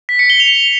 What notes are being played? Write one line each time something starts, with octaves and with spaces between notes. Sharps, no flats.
B6
C#7
G7
F7